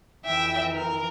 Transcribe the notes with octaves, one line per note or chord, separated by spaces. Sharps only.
F2 E3 E5 G5
A#4